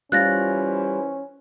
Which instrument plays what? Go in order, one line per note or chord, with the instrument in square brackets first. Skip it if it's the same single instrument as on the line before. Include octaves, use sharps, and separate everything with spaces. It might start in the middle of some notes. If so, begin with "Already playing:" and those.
[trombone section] E3 C5 [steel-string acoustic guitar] G3 F4 [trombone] C#4 [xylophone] F#6 A6 A#6